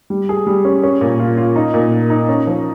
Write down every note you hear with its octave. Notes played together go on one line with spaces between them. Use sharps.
G3
G#4
G3
C#4
C#4
A#2
F4
F4
D#4
A#2
A#3
D#4
C#4
F3